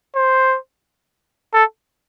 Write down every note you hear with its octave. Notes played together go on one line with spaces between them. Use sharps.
C5
A4